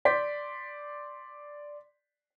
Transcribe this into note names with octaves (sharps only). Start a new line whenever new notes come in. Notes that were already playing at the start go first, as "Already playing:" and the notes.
D5 C6 G6 B6